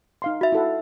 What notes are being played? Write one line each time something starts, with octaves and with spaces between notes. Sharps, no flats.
D#4 F5 C6
F#4 E5
E4 A4 F#5